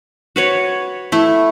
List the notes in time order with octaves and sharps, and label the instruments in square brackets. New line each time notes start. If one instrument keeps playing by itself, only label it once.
[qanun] F#4 B4 C#5
[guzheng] A3 [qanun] E4